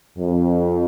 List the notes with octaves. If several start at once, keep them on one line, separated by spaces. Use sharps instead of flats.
F2